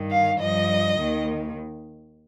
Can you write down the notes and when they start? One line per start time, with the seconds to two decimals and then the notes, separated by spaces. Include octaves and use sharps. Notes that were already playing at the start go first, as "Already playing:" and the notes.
Already playing: G2 D#3
0.11 F5
0.40 G2 F3 D#5
0.97 D#2 D#3